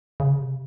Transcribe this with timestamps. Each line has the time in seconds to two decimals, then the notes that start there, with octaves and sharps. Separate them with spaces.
0.20 C#3
0.39 C3